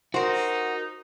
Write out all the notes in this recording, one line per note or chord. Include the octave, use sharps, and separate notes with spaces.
D#4 F#4 A#4 C5